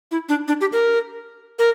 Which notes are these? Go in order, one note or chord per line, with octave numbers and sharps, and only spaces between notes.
E4
D4
D4
G4
A#4
A#4